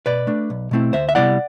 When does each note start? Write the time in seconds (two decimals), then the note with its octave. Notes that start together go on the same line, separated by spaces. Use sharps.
0.06 B2 B4 D5
0.27 A3 D4
0.50 B1
0.71 B2 A3 C4 E4
0.93 D2 C5 E5
1.09 E5
1.15 C3 G3 B3 E4 D5 F#5